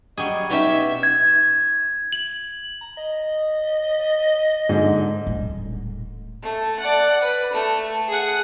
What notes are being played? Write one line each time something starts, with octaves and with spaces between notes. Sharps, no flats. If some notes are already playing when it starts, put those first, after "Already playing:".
F#3 G3 G#4 D#5
B2 C#4 D#4 G4 E5
G#6
F#7
A#5
D#5
G#2 D3
D#1 A2
A3
D5 F#5
B4
A3
G#4 F#5